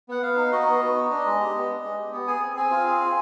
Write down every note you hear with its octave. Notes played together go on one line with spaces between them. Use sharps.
B3 F#5
B3 F5
D#4
F#4 D#5
B3
B3
D#4
D4
G#3
G4
B3
D4
G#3
G4
B3
G#4 G#5
C4
C4 G#5
F4
G#4
C4